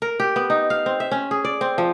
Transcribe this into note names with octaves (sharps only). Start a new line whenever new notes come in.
A#4
G4
B3
D#4
F5
C4
E5
C#4
G#4
D5
C4
F3